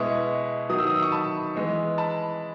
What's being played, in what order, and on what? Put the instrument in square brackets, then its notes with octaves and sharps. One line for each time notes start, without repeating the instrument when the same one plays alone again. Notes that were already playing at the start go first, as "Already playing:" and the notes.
Already playing: [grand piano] B2 G#3 B3 E4 C#6 D#6
D#3 F#3 B3 D#6
E6
D#6
E6
C#6 D#6
A5 B5
E3 G#3 B3
A5 B5